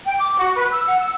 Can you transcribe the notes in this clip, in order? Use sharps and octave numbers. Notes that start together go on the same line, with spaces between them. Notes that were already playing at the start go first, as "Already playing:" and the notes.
G5
D6
F#4
B4
E6
F#5
E6